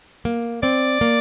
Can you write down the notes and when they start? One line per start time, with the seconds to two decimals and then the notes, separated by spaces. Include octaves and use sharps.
0.25 A#3
0.63 C4 D5
1.01 A#3